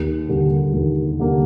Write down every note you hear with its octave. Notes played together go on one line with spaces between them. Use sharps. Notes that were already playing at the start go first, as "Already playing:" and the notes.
Already playing: D#2
D3 G3 A#3
D#2
D3 G3 A#3